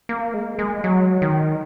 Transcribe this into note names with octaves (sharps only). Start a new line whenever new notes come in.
A#3
G#3
G#3
F#3
D#3